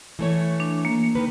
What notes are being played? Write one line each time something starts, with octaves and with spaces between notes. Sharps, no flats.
E3 A3 C#5
D4
A#3
D#3 B4